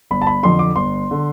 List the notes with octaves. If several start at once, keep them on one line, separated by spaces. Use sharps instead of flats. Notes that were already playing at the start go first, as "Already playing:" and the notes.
G1 B5
A5
B5
F2 D3 C6
D6
G1 C6
D3